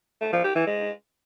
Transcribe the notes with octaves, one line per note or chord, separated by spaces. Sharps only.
A3
F3
G4
E3
G#3